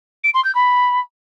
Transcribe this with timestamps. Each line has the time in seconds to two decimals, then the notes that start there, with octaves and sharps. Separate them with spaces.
0.24 D7
0.34 C6
0.45 G6
0.55 B5